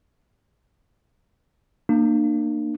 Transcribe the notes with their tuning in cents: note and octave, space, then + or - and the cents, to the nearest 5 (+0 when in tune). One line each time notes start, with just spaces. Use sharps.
A#3 -5 D4 +40